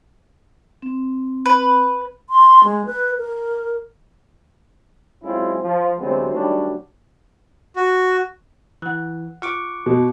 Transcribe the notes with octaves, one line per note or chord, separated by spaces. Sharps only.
C4
B4
C6
G#3
B4
A#4
F#3 G#3 C4 C#4 E4 F4
F3
D2 C3 F#3 G#3 B3 C4
D#3 F#3 G3 A3 C#4 D4
F#4
E3 F#5 F#6
F4 F#5 C#6 D6
B2